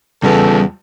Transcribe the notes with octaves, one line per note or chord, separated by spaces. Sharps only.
E2 C#3 E3 G3 B3 F4 A4